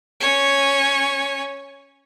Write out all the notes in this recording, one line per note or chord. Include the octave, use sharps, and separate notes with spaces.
C#4 C#5